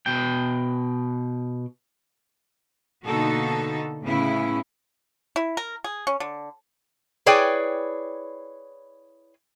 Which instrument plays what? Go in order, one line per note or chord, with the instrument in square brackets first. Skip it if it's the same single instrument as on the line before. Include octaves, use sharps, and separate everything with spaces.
[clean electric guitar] B2 G5
[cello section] B2 D3 A#3 D#4 F#4 A4
A2 C#3 B3 C#4 E4
[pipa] E4
A#4
G#4
C#4
D3
[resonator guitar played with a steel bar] E4 G#4 B4 C#5 D5 G5